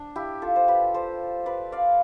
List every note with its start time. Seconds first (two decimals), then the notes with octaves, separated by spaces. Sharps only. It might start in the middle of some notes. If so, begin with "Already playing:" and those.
Already playing: D4
0.16 E4 G4
0.42 F4 A4
0.56 C5
0.68 G4 B4
0.94 A4 C5
1.46 B4 D5
1.72 D5 F5